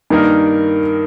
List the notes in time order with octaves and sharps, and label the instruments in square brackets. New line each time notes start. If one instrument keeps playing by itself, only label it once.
[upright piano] G2 D#3 A#3 D#4 A#4